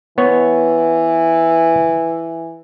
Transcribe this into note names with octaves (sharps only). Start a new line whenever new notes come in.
E3 B3 C#5